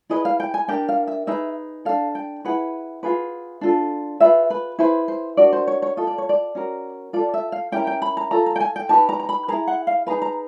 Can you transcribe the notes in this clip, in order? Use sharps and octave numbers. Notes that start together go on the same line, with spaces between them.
E4 G#4 B4 D#5
F5
G5
G#5
D4 G4 A#4 G5
F5
E5
D#4 G#4 B4 E5
D4 F#4 A4 F5
G5
E4 G#4 B4 F#5
F4 G#4 B4
D4 F4 A4
F4 G#4 B4 E5
B4
E4 G#4 B4 C5
C5
D4 F#4 A#4 D5
C5
C#5
C#5
F4 A4 D#5
D5
C#5
D5
C#4 F#4 A#4
F4 A4 D5
E5
F5
C#4 E4 G4 A#4 G5
G5
B5
A#5
F4 A4 A#5
A#5
G5
G#5
G5
D#4 G4 B4 A5
A#5
A#5
B5
E4 G#4 B4 A#5
F#5
F5
D#4 G#4 B4 A#5
A#5